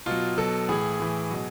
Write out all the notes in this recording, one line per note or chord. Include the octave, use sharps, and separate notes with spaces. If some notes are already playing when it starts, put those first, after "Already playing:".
B2 F#3 F4
B2 F#3 A4
A2 E3 G#4
A2 E3
B2 F#3